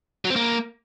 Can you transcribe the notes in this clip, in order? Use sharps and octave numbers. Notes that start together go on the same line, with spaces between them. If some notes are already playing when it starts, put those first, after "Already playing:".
F#3
C4
A#3